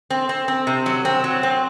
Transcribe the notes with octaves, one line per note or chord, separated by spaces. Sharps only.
C4
C4
C4
C3
F#3
C4
F#3
C4